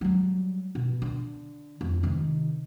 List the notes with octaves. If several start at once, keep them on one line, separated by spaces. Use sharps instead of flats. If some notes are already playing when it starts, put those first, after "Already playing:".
F#3 G3
B2
D3
F2
C3 D#3